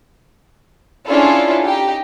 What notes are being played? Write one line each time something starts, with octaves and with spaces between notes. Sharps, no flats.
C#4 D4 E4 F4 G#4 A4
D#4 G4